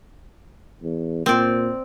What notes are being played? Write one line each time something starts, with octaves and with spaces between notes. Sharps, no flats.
E2
A#2 C4 D5